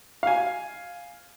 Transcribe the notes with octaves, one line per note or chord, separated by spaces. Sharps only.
F5 G#5